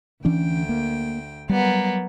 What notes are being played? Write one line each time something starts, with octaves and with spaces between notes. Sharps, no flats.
D2 E3 C#4 D4 G5
A#3
F#3 G3 A#3 B3